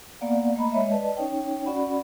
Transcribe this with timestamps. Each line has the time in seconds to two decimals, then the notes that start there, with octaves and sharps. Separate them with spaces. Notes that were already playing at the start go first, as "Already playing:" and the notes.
0.21 A#3 B3 D5 F5 F#5
0.55 A3 A#3 D#5 A#5 B5
0.72 G#3 C#5 D#5 E5
0.91 B4 D5 D#5 A5
1.17 C#4 D#4 C#5 G5
1.66 C#4 F#4 D5 F#5 B5